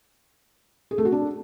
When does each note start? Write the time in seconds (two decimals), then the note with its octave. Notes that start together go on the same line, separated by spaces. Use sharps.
0.91 G#4
0.98 A3
1.05 F#4
1.12 D4